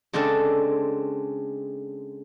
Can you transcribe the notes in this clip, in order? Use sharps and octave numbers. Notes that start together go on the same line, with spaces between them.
C#3 G#3 C4 D4 A4